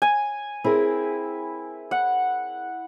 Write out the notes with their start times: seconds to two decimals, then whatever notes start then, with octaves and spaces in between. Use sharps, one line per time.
0.02 G#5
0.64 C4 E4 G#4 A#4
1.91 F#5